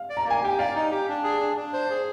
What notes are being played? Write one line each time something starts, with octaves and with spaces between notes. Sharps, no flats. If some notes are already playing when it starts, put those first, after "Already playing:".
Already playing: F5
D5
A#5
A#3 G#5
G4 G5
D5 F5
D#4
G4
D4
G#4
D4
D4
C5
G#4